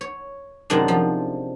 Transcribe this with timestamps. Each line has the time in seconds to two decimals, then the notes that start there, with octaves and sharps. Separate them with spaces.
0.01 C#5
0.70 F#2 C3 D#3 G#3 D4
0.88 F3